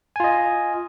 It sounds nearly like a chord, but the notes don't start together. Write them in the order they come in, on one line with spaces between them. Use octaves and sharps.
G#5 F4 D#5